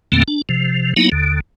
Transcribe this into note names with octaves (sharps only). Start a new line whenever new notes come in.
E2 A#2 D3 A3 A#3 C4
D4
C3 F3
F#3 A#3 B3 D#4 E4
D#2 D3